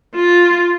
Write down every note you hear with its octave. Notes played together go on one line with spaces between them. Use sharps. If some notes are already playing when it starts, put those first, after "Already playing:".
F4